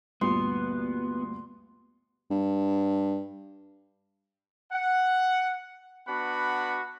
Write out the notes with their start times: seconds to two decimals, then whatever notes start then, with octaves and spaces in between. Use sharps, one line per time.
0.21 D2 G2 A#2 B3 C6
2.31 G2
4.72 F#5
6.07 B3 D4 F#4 F#5 B5